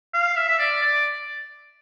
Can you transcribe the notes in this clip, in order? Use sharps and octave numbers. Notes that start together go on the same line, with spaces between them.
F5
E5
E5
D5
D5